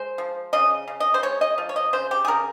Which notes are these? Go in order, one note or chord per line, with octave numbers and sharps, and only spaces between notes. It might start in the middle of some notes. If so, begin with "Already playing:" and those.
Already playing: G#3 C5
F3
C#3 D#5
C#3
D#5
C5
G#3 C#5
D#5
F3
C#5
D#5
C#3 C5
G4
G#4
C#3 A#4